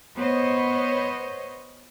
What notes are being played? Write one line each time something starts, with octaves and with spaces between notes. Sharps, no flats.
B3 C5 C#5 D#5